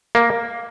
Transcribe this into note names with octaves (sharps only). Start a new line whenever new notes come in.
A#3